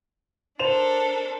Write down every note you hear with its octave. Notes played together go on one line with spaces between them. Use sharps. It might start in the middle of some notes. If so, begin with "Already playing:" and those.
D4 A4 A#4 C5 E7 F7